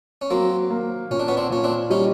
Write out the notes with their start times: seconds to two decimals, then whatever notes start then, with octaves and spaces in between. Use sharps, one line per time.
0.21 C#4
0.30 F#3 A#3 C4
0.70 A#3
1.11 A#2 C#4
1.19 D4
1.28 B3 C#4
1.37 C4 D4
1.50 A#2 C#4
1.64 C4 D4
1.90 G3 C#4 D#4